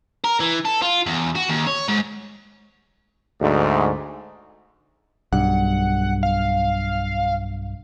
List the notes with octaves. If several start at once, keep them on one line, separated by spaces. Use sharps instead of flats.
A#4
E3
A4
F4
E2
F#4
D#2
C#5
G#2
D2 G#2
B1 G2 F#5
F5